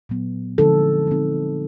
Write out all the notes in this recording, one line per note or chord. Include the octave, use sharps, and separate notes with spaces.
A#2 F#3 B3
D3 F3 G#3 C4 D#4 A4
D3 F3 G#3 C4 D#4